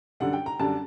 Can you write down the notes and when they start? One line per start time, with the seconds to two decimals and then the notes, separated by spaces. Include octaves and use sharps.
0.20 F#2 D3 G3 D4 F#5
0.33 G5
0.46 A#5
0.59 F#2 D3 G3 D4 A5